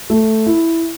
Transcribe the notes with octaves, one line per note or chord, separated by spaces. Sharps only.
A3
E4